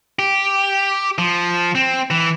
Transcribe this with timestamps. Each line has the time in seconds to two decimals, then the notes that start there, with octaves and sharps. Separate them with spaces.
0.19 G4
1.18 F3
1.75 C4
2.11 E3